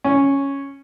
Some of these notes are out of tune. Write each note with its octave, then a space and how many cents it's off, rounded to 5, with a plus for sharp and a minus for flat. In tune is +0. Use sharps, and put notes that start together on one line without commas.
C#4 +0